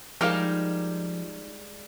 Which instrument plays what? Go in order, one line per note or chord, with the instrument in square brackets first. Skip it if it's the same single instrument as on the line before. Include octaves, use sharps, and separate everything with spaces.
[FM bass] F3 [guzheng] G3 G#3 G4 [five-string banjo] D#4 A#4 F5